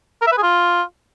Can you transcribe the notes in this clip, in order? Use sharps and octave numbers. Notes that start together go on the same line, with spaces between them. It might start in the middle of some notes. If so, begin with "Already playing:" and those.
A#4
E5
B4
G#4
F4